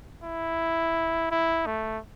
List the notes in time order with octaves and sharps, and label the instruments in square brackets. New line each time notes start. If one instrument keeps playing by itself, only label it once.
[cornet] E4
E4
A3